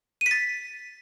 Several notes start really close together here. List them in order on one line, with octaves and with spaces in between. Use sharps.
D#7 B6 A6